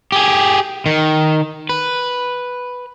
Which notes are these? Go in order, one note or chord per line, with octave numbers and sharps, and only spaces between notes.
G4 G#4
D#3
B4